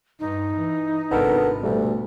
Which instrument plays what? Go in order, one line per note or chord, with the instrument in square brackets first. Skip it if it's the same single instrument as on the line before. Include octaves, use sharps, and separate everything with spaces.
[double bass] G2 [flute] D#4
[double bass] E3
[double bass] G#1 C3 [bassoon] B3 [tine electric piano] D4 A4 A#4
[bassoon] D2 [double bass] B2 [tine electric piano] G3 A3